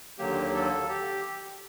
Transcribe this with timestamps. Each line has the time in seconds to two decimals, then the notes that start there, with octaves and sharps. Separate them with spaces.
0.19 D#2 D3 F#3 A#3 G4
0.55 A4
0.89 G4